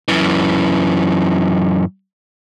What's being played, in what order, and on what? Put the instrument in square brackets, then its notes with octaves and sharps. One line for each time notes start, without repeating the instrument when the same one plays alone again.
[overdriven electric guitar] F#2 E3